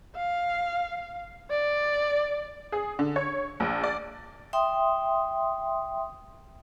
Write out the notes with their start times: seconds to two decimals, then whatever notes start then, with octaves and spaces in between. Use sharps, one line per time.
0.16 F5
1.50 D5
2.72 G#4
2.99 D3
3.16 C#5
3.60 A#1
3.84 D5
4.53 E5 G5 C6 D#6